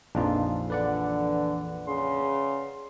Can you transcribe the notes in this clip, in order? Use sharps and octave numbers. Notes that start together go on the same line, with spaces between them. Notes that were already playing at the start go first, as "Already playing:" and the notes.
A#1 F2 D4 D#4 F4 B4
D3 E3 B4 D5 F#5
C#3 C6